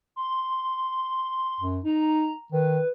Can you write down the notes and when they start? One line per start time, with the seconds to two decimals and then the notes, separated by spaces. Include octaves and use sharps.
0.16 C6
1.61 F#2
1.84 D#4 A#5
2.52 D#3 B4